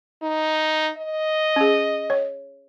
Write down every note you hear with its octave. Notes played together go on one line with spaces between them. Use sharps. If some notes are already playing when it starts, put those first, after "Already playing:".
D#4
D#5
C#4 G#4
C#5